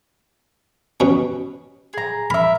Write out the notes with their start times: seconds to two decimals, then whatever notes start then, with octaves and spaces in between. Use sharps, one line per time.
1.00 B2 C#4
1.94 G#4 A#5
2.30 A#4 E5 B5